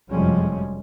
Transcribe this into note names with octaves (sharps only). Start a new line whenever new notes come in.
F1 F#2 F3 G3 G#3 C#4